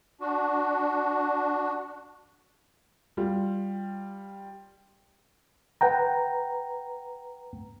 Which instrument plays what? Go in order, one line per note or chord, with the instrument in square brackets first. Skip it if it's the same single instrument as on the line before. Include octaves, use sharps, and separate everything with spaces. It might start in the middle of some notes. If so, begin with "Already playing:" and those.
[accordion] D4 F#4
[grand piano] G3 F4
[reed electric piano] B4 F#5 G5 A#5